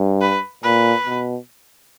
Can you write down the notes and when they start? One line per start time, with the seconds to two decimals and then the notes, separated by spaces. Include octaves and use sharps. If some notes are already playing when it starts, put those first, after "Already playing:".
Already playing: G2
0.21 B4
0.63 A#2 B4
1.07 B2